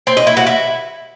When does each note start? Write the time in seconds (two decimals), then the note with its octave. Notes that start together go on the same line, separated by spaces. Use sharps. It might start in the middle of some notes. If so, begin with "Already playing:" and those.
0.07 C4
0.17 D#5
0.27 E4
0.37 F#4
0.47 E4